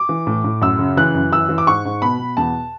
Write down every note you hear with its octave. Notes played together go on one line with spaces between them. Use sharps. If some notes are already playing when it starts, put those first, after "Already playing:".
Already playing: D6
E3
A2
A2
F#2 E6
C#3
E3 F#6
F#2
E3 E6
E3
D6
G#2 C#6
G#2
B2 B5
B2
E2 A5